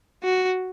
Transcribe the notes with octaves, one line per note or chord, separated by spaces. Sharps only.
F#4